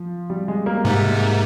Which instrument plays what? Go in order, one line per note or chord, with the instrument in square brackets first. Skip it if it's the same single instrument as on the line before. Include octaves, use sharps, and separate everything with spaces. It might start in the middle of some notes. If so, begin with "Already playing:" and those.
Already playing: [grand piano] F3
G3
G#3
A#3
[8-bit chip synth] G#2 C3 [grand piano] G#3
[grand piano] A#3
G#3